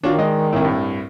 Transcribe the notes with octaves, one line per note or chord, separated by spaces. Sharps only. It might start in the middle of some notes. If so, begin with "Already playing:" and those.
D#3 D4 F4 F#4 C#5
G#3 D5 D#5
C2 A2
G2